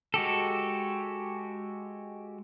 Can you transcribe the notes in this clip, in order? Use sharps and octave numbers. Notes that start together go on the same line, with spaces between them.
G#3 F#4 G4 A4